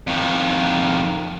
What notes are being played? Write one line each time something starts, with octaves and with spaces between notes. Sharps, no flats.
F2 D#3